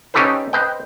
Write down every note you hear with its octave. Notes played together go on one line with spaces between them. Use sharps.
C#4 D#4 G4 A4 B4 C5
B4 C5 D#5 G5